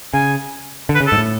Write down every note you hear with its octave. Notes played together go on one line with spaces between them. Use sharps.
C#3 G#5
D3
B4
C#3
A4
G#2
A2